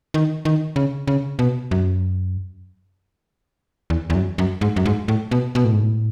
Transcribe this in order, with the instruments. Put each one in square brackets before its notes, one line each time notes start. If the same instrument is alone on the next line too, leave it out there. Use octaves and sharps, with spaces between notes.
[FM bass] D#3
D#3
C#3
C#3
B2
F#2
E2
E2
F#2
F#2
G#2
F#2
G#2
A2
B2
B2
A2
G#2
A2